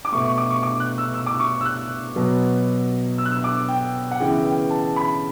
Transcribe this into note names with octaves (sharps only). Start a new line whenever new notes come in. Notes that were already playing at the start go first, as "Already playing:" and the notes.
D6
B2 A3 C#6
C#6
D6
C#6
D6
F#6
E6
E6
D6
C#6
E6
F#6
B2 F#3 B3
E6
F#6
E6
D6
G5
F#5
C#3 E3 B3 G5
G5
A5
B5